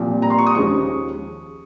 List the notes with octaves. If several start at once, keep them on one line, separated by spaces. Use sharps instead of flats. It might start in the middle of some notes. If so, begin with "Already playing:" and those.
Already playing: C2 A#2 F3 C4
A#5
C6
C#6
D#6
D#2 C#3 F3 G#3 C#6